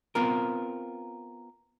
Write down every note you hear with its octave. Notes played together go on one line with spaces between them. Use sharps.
B3 C4 F4 A#4